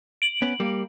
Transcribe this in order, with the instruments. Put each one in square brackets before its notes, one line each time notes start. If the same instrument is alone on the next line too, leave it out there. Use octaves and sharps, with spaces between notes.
[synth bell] D7 F#7
[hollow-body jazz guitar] B3 C#4
G3 A#3